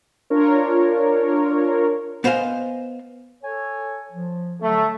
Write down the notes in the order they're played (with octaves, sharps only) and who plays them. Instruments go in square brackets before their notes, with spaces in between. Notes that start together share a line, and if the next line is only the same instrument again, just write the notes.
[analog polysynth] D4 F4 A#4 C#5
[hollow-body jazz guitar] B3 C5 D#5 F5 G#5
[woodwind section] A4 C#5 G#5
F3
[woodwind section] D3 F#3 [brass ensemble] A3